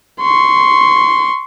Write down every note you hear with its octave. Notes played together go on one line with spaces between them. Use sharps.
C6 C#6